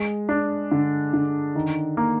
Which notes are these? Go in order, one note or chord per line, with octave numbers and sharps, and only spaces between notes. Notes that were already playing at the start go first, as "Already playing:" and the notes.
Already playing: G#3
D4
D3
D3
D#3
A#3